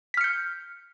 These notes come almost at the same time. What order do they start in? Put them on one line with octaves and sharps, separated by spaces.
B6 F6 C#7 G6